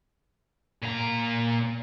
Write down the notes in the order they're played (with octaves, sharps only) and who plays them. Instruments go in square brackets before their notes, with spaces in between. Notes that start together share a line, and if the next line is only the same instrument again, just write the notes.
[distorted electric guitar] A#2 A#5